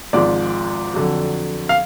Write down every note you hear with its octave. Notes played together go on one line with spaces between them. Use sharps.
G#1 G#2 F3 D5
F2 D3 F#3
F5